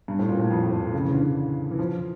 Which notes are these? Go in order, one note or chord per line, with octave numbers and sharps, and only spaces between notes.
G2
A2
A#2
A2
F2
A2
C#3
E3
D3
E3
F3